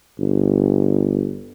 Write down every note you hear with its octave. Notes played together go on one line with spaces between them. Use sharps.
G1